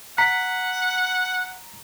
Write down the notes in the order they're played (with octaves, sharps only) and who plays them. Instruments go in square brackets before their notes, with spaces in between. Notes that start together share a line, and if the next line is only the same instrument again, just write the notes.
[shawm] F#5 [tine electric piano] A#5 B6